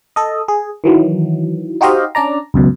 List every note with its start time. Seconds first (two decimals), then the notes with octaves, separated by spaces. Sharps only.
0.16 A4 D#5
0.48 G#4
0.84 D#3 E3 F#3
1.81 D#4 F#4 G4 C5 D#5 F5
2.15 C#4 D4 D5 A#5
2.54 C#2 F#2 B2